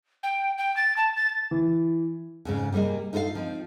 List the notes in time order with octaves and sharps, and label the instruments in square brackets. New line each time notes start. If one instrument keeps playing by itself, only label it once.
[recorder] G5
G5
A6
A5
A6
[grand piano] E3
[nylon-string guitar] F2 G#2 C#3
C3 G3 A#3 G#4 D#5
D#4 F4 A4 D#5 F5
F3 C4 D#4